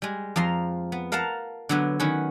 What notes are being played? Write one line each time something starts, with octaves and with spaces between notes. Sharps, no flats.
G3 G#3
F2 F3 A#5 C6
B3
A#4 F5 F#5 A5 A#5
D3 F#3 B3
D#3 C#4 F#4 B4 C#5